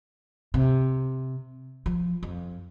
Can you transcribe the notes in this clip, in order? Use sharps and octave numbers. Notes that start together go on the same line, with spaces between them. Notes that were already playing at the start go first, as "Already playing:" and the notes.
C3
F3
F2